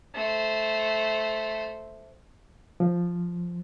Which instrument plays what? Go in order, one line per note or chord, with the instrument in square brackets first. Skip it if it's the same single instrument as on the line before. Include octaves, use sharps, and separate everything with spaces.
[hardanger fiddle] A3 C5
[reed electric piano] F3